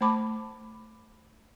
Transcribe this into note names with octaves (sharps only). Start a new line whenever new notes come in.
A3 C5 A5 B5 D6